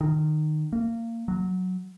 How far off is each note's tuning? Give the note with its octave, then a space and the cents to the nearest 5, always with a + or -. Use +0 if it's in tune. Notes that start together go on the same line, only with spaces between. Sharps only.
D#3 -20
A#3 -25
F#3 -5